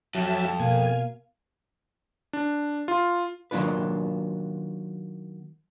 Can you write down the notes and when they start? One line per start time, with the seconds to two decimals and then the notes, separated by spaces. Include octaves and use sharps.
0.15 F2 F#3 E5 A5
0.60 B2 A#3 F5 G#5
2.33 D4
2.88 F4
3.51 D#3 F#3 A#3 D4 F4 B4